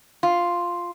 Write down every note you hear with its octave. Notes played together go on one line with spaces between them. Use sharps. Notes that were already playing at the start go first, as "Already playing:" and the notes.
F4